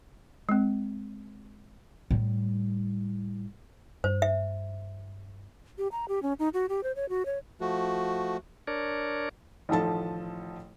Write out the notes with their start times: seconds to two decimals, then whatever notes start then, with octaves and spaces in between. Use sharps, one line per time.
0.49 G#3 C4
2.11 A2 G3
4.04 G2 C5
4.22 E5
5.78 G4
5.92 A#5
6.08 G4
6.23 C#4
6.39 D#4
6.54 F#4
6.69 G4
6.83 C5
6.96 C#5
7.09 F#4
7.26 C#5
7.61 F3 A3 F#4
8.67 D4 A#4 C#5 D5
9.69 A1 D#3 F3 A4 A5